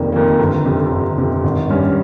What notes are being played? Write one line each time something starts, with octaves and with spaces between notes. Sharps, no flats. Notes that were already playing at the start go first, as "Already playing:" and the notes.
Already playing: F1 F2 D#3 A#3
F2 D#3 A#3
G1
F2 C3
G1
F2 C3
G#1
G2 G3 C#4